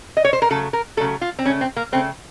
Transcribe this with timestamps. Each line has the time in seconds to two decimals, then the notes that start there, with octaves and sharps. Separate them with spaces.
0.17 D#5
0.25 C#5
0.33 C5
0.42 A#4
0.50 C#3 F#3 A3 A4
0.73 A#4
0.97 A3 A4
1.00 C#3 F#3
1.21 F4
1.39 C4
1.45 C#3 C#4
1.50 A3
1.61 C4
1.76 A#3
1.92 C#3 A3 C4